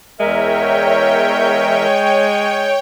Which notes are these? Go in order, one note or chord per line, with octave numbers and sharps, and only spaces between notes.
E2 G#3 A#4 C#5 E5 G5